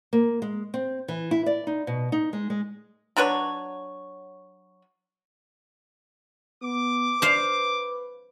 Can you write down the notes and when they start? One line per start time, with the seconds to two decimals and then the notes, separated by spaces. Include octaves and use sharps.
0.13 A#3
0.42 G#3
0.74 C4
1.08 E3
1.31 E4
1.46 D5
1.67 D#4
1.87 B2
2.12 D#4
2.33 G#3
2.50 G#3
3.17 F#3 D4 B4 C#5
6.62 B3 D6
7.22 B4 C5 F5